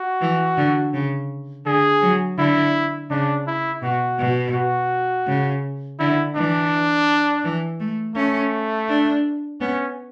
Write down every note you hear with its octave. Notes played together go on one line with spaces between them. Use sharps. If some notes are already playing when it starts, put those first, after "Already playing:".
Already playing: F#4
E3
D3
C#3
D3 G#4
F#3
D3 E4
C#3 D4
E4
B2 F#4
B2
F#4
C#3
D3 E4
E3 D4
E3
A3
A3 C#4
D4
B3 C#4